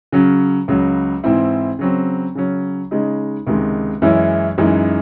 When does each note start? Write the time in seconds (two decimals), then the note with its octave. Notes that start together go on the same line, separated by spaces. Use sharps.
0.12 C#3 F#3 C#4
0.68 C#2 C#3 F#3
1.24 G#2 E3 C4 E4
1.79 C#3 F#3 C4
2.35 C#3 F#3 C#4
2.91 C#3 G#3 D#4
3.47 C#2 C3 D#3 G#3
4.02 F#2 E3 G#3 C#4 E4
4.58 F#2 E3 G#3 D#4